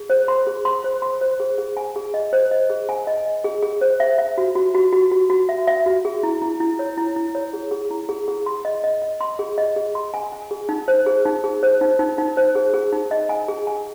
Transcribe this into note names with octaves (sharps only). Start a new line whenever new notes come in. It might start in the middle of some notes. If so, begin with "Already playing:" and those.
Already playing: G#4
C5
C6
G#4
C6
C5
C6
C5
G#4
G#4
G#5
G#4
D#5
C5
D#5
G#4
G#5
D#5
D#5
G#4
G#4
C5
E5
E5
F#4
F#4
F#4
F#4
F#4
F#4
E5
E5
F#4
G#4
E4
E4
E4
C#5
E4
E4
C#5
G#4
G#4
E4
G#4
G#4
C6
D#5
D#5
D#5
C6
G#4
D#5
G#4
C6
G#5
G#5
G#4
D#4
C5
G#4
D#4
G#4
C5
D#4
D#4
D#4
C5
G#4
G#4
D#4
D#5
G#5
G#4
G#5